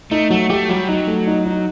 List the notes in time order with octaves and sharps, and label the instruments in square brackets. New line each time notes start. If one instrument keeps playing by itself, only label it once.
[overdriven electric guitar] A3 [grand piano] D#4
[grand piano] F#3 [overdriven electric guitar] A3
[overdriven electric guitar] A3 [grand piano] G4
[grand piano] F#3 [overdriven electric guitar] G3
[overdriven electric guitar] F#3 [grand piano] D#4
[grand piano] A3
D#4
D#4